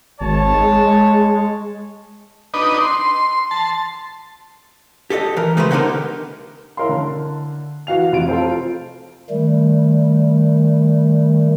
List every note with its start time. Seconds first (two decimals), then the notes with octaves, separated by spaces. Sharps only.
0.21 G#1 C#5 A5
0.54 G#3
2.54 D4 D#4 B4 D#5
2.81 C6
3.51 A5 C6
5.10 G4 A4 C#5 D#5
5.37 E3 A#4
5.57 C#3 G#3 A3 G4 B4 C5
5.71 D3 B3 D#4 E4 G4 A#4
6.77 E4 A#4 C#5 F5 C6
6.89 D3
7.87 E3 F#4 F5 F7
8.12 F1 F4 D7
8.29 F4 A4 C5
9.30 D#3 G3 A3